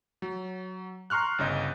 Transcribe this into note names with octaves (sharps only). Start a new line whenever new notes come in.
F#3
A#5 C6 C#6 F6 F#6
G1 C#3 D#5 G6